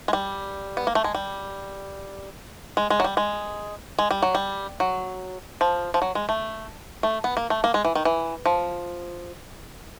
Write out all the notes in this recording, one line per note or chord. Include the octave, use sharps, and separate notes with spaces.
G#3
G3
B3
A#3
A3
G#3
G3
G#3
G#3
F#3
G3
G#3
G#3
G3
F#3
G3
F#3
F3
F3
F#3
G#3
A3
A3
B3
A#3
A3
A#3
G#3
E3
D#3
E3
F3